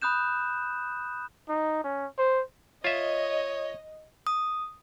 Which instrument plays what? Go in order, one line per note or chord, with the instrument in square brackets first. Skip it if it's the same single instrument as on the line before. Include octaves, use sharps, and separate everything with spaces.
[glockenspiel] B5 D#6 F#6 G6 E7
[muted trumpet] D#4
C#4
C5
[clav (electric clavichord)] F4 E5 [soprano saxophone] C#5 [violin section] D#5
[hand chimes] D#6